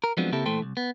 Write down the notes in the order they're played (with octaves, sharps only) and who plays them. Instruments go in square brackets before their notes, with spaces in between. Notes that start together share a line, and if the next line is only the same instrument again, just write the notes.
[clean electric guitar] A#4
F3 F#3 G#3 B3 C4 D4
C#3 A#3 C4 E4 G4 A4
A#2 E3 A3 A4 C5 G5
C2
B3